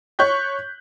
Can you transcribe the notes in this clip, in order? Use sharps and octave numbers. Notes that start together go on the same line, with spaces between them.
C#5 C#6 F#6 G6 B6